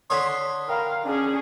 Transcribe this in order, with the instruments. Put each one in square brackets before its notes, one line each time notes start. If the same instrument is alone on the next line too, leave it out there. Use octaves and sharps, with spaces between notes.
[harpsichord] D3 A4 C#5 [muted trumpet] C6 [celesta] D#6 B6
[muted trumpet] A#4 [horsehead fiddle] F5 [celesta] G5 B5
[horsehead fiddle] C#4 G#4 [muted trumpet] D4